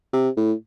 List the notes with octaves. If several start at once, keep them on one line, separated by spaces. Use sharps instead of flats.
C3
A2